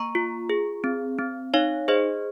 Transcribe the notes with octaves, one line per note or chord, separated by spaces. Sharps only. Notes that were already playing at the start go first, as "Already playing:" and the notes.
Already playing: A#3 A#5 C#6
F4
G#4
C4
C4
D#4 C#5 F5
G#4 C5 D#5